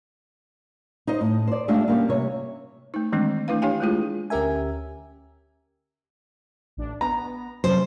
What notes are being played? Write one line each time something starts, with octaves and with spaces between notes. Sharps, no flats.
D#4 C5 D#5
A2
C5 D5
G#3 A3 D4 F4 G4
C#3 G3 A#3
C3 C#5
A3 D#4
D#3 E3 G#3 A3 C4 D4
A3 D4 E4 B4 F5
D4 G4 C#5 F5 G5 G#5
G#3 A3 E4 F4 G#4
D2 C#4 G4 A#4 E5 G#5
A1 D4
B3 A#5
C3 F#3 C#4 C5